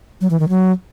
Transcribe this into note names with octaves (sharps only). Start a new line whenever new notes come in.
F#3
E3
D#3
F#3